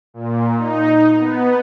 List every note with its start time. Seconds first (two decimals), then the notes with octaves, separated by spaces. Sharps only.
0.14 A#2
0.56 D#4
1.17 B3